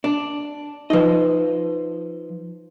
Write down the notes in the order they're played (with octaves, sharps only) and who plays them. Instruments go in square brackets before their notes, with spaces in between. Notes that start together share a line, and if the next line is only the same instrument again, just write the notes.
[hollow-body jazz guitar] D4
[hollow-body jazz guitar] F3 D#5 [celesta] D#4 B4